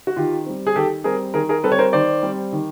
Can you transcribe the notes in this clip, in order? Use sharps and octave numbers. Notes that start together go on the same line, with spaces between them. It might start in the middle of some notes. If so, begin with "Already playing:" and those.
F#4
D#3 F4 G4
G3 C4
G#4
D#3 G4 A4
G3 C4 G#4 A#4
D#3 G#4 A#4
G#4 A#4
G3 C4 A4 B4
C#5
A#4 C5
D#3 C5 D5
G3 C4
D#3